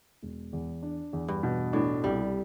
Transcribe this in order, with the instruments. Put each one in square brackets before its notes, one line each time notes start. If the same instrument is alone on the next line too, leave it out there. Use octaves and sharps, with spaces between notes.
[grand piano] E1
E2
D4
E2
[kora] G2
[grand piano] B2
[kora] A2 [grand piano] D4
[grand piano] C2 [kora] G3